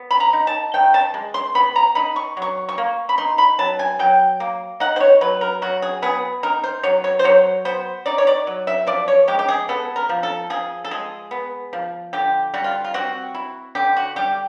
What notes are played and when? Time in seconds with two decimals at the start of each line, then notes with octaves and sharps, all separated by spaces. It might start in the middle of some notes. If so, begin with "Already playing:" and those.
Already playing: B3
0.11 B5
0.20 A#5
0.33 D#4
0.47 A5
0.74 D#3 G5
0.94 A5
1.14 G#3
1.34 C6
1.55 B3 B5
1.76 A#5
1.95 D#4 B5
2.16 C#6
2.37 F#3
2.42 C#6
2.69 C#6
2.78 A#3
3.09 B5
3.18 D#4 C6
3.38 B5
3.59 F#3 A5
3.79 G#5
3.99 F#3 G5
4.40 A#3
4.80 D#4 F#5
4.96 C5
5.00 C#5
5.21 F#3 B4
5.41 A#4
5.62 F#3 F#4
5.82 G#4
6.02 B3 G#4
6.43 D#4 A#4
6.64 C5
6.83 F#3 C#5
7.04 C#5
7.19 C5
7.24 F#3 C#5
7.65 B3 C5
8.06 D#4 D5
8.18 C#5
8.27 D5
8.47 F#3
8.67 E5
8.87 F3 D5
9.08 C#5
9.28 G#3 G4
9.39 G4
9.48 G#4
9.69 B3 A4
9.96 A#4
10.09 F3
10.23 A4
10.50 F3 G#4
10.84 A4
10.91 G#3 G#4
11.31 B3
11.73 F3
12.13 D3 G4
12.54 G3 F#4
12.64 F4
12.84 F4
12.94 C4 F#4
13.34 E4
13.75 D3 G4
13.97 F#4
14.16 G3 G4